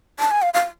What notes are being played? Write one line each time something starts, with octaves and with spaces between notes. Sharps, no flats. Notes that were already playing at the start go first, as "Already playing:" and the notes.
A5
G#5
F5
F5